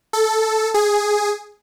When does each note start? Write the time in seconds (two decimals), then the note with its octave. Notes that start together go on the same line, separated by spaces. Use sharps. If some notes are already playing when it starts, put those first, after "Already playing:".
0.13 A4
0.74 G#4